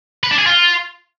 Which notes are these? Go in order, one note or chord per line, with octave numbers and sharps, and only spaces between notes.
B4
D4
G#4
F4